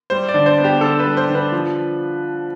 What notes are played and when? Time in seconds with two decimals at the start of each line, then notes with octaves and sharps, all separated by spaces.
0.10 G3 C5
0.28 D5
0.34 D3
0.46 C5
0.58 B3
0.64 G4
0.81 D3 A4
0.99 B4
1.05 G3
1.17 C5
1.29 D3
1.35 B4
1.52 F3